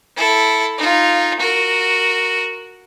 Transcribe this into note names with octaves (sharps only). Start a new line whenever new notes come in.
E4 A4
D#4 F4
F#4 A#4